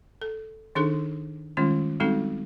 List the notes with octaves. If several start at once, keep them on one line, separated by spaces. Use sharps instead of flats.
A4
D#3 D4 D#4 G#4 A4
D#3 G3 G#3 C#4 F4
G3 G#3 C4 D#4 F#4 A4